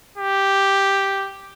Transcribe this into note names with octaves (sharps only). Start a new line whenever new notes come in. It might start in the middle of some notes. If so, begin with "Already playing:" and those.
G4